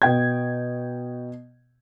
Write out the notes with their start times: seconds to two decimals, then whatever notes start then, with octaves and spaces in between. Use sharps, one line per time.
0.02 B2 G5 G#6